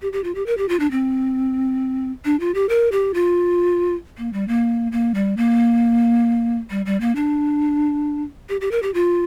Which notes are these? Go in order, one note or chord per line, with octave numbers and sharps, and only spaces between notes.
G4
G4
F4
G4
A#4
G4
F4
D4
C4
D4
F4
G4
A#4
G4
F4
A#3
G3
A#3
A#3
G3
A#3
G3
G3
A#3
D4
G4
G4
A#4
G4
F4